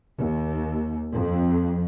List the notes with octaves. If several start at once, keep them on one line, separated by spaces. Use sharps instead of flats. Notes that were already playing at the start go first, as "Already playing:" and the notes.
D#2
F2